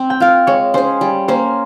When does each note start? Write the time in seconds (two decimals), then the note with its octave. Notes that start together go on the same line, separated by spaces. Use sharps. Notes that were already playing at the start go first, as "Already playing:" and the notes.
Already playing: C4
0.10 G5
0.20 F4 A#4 F5
0.47 G#3 C#5
0.74 C#4 G#4 C5
1.01 G3
1.28 A#3 C#4 C5